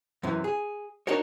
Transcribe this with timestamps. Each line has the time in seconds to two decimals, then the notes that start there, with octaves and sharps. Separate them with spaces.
0.23 F#2 C3 E3
0.44 G#4
1.07 D4 D#4 F#4 A#4 C#5